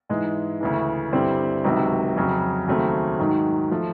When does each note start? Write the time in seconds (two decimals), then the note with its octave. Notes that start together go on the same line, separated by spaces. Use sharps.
0.09 G#2 E3 G#3
0.61 D2 C#3 E3
1.12 G2 D3 G3 C4 E4
1.64 C#2 C3 D#3 F#3
2.16 F2 C#3 F#3
2.67 D#2 C#3 F#3 A3 C4
3.19 G#2 D#3 F#3
3.71 F3 A3